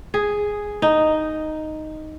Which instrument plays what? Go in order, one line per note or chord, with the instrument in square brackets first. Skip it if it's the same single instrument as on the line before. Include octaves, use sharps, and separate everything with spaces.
[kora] G#4
D#4